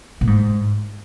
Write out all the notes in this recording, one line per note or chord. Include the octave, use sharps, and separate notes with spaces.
A#2
G#2